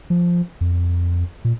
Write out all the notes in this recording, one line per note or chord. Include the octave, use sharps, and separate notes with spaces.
F3
F2
A#2